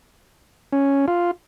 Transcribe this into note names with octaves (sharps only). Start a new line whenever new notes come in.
C#4
F4